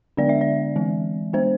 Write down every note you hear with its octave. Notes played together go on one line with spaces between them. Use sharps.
D3 G#3 B3 D4 D5
E5
D5
E3 G#3 C4
G#3 B3 D4 C5